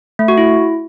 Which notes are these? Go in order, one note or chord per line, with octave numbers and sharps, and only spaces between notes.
A3
F#4
E4